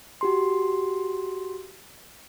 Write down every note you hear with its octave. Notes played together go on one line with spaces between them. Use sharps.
F#4 G4 C6